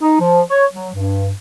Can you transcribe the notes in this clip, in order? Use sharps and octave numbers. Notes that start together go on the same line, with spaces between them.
D#4
F3
C#5
F#3
G2